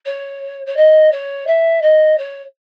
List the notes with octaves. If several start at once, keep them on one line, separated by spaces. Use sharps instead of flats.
C#5
C#5
D#5
C#5
E5
D#5
C#5